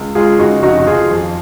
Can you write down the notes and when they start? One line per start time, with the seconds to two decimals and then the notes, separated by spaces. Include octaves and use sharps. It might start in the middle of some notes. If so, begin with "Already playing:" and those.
Already playing: C#2
0.15 G#3 F4 G#4
0.39 C#3 D#4 F#4
0.63 F1 D#4 F#4
0.78 F#4
0.86 F3 F4 G#4
1.11 F2